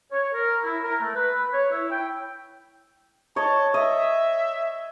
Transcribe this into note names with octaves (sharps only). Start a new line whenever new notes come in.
C#5
A#4
E4
A#4
A3
B4
C#5
E4
G5
C#5 D#5 A5
D#5 E5